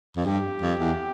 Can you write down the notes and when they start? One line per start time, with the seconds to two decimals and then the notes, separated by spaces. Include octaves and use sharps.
0.17 F2
0.26 G2 G4
0.62 F2
0.79 E2